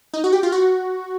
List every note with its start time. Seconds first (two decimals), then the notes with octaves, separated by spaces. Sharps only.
0.13 D#4
0.24 F#4
0.33 G4
0.43 F4
0.52 F#4